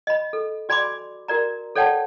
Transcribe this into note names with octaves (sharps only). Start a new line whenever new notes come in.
D#5 B5
A4
F#4 D5 G#5 B5 C6 D6
F#4 A#4 D5 A#5
A4 C#5 D5 F#5 G5 A5